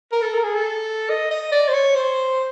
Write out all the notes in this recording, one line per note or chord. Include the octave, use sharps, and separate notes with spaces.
A#4
A4
A#4
G#4
A4
D#5
D#5
D5
C5
C#5
C5